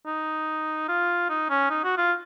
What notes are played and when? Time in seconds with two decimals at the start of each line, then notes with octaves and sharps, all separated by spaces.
0.06 D#4
0.88 F4
1.29 D#4
1.49 C#4
1.71 D#4
1.84 F#4
1.98 F4